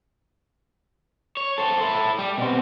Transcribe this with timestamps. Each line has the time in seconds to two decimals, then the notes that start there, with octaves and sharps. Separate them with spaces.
1.37 C#5
1.58 A4 C5
1.81 E4 A4
2.19 G3
2.38 B2 C4